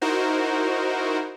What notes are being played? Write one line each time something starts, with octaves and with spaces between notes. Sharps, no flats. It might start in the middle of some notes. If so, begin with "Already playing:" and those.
D#4 E4 F#4 A#4 C5